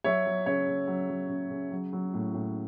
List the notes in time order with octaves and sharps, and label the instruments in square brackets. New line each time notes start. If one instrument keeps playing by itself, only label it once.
[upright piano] F#3 C#5 E5
F#3
C#3 C#5
C#3
F#3
F#3
C#3
C#3
F#3
F#3
A2
A2